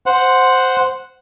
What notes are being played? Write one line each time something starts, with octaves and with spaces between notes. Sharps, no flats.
C5 F#5